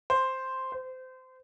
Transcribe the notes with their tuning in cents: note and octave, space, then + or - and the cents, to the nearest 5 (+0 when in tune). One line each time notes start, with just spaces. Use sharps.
C5 +0
C5 -25